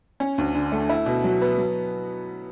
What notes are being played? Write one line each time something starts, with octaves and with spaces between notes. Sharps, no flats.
C#4
D2
D3
A3
E4
B2
F#3
B3
F#3